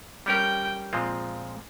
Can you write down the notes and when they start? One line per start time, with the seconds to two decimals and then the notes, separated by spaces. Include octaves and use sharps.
0.26 G3 C#4 G4 A#4 G5
0.93 A#2 F3 G#3 C4